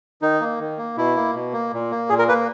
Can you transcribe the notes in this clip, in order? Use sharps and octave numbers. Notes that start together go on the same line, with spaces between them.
D#3 D#4
A#3
D#3
A#3
B2 E4
A#3
B2
A#3
A#2
A#3
A#2 G#4
A#4
A#3 B4